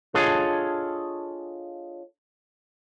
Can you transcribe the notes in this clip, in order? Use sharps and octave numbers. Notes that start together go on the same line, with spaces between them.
D4 F4 G#4 A4 C#5 D#5